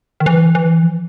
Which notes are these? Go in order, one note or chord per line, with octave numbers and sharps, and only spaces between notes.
D#3
E3
E3
F3